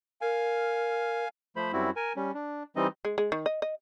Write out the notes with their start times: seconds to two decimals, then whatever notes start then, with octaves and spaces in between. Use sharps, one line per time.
0.21 A#4 F5 G#5
1.56 F3 A3 C5 B5
1.73 F#2 G3 C4 E4 F#4
1.96 A#4 G#5
2.16 G3 C#4
2.34 D4
2.76 E3 G3 C4 D#4 D#5
3.05 G#3
3.18 G#3
3.32 D#3
3.46 D#5
3.62 D#5